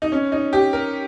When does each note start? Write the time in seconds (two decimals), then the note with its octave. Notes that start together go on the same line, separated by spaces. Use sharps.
0.02 D#4
0.12 C#4
0.32 D#4
0.53 G4
0.73 A#4